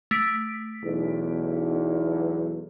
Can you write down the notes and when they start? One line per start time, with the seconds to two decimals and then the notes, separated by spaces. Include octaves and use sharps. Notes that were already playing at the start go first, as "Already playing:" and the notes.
0.11 A3 B6 D7
0.83 B1 E2